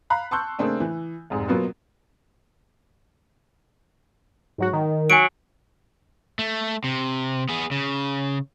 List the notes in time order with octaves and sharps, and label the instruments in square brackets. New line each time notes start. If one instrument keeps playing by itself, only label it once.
[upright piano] F5 A#5 B5 F#6
A5 C6 C#6 E6 F#6 G6
C#3 A3 A#3 C4 D4
E3
F1 G#2
B2 F#3 A#3 B3 F4 F#4
[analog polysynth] G#2 F#3 F#4
D#3
[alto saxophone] F#3 [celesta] G#5 D7
[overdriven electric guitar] A3
C3
B3 G#4
C#3